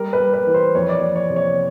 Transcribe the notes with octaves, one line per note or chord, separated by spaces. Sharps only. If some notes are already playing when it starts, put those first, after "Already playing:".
Already playing: G3 A#4
B4
G3
B4
E3
C5
F2 C#5
D5
C#5
F2
C#5
C3
C#5